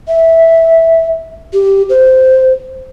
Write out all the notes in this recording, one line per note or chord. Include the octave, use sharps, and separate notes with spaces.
E5
G4
C5